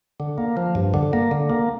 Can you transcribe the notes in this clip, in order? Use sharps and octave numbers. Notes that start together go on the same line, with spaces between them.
D3
A#3
F3
G2
D3
A#3
D3
A#3